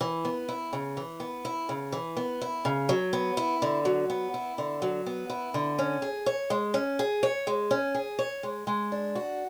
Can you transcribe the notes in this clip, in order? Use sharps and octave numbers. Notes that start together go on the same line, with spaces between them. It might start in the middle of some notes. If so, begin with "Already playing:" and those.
E3
B3
E4
C#3
E3
B3
E4
C#3
E3
B3
E4
C#3
F#3
B3
E4
D3
F#3
B3
E4
D3
F#3
B3
E4
D3
C#4
G#4
C#5
G#3
C#4
G#4
C#5
G#3
C#4
G#4
C#5
G#3
G#3
D4
F#4